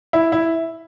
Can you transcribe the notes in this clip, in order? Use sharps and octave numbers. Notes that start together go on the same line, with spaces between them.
E4
E4